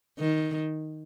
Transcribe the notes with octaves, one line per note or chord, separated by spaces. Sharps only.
D#3